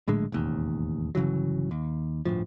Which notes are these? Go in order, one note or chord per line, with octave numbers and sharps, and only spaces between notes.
A#1 A2 D3 G#3
E1 A1 D#2
G1 C#3 E3 F#3
D#2
G1 D2 A2 F3